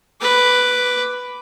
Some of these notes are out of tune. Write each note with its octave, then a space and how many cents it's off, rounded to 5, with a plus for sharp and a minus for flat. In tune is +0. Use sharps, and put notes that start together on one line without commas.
B4 +0 D6 +0